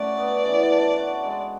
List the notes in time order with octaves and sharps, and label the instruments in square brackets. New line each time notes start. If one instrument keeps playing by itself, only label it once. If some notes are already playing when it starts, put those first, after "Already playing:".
Already playing: [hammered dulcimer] A3 C#4 F#4 [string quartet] D5
[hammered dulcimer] B3
E3
D4
F#4
G#3